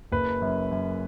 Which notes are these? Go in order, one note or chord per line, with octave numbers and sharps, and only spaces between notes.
F#1 B4
F#2
F#2